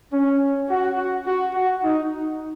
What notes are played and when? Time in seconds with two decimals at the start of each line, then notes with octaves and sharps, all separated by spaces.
0.13 C#4
0.70 F#4
0.98 F#4
1.27 F#4
1.55 F#4
1.84 D#4